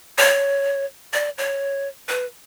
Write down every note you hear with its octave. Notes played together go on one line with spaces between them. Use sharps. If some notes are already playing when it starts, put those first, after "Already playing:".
C#5
D5
C#5
B4